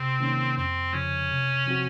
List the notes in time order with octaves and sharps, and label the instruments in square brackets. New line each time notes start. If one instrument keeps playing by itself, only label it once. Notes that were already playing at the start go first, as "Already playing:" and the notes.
Already playing: [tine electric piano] C3 [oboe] C4
[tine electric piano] D#3 A#3 C#4
[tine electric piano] F2 [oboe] C4
[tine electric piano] C#3 F3 [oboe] C#4
[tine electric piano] C3
F3 C4 F#4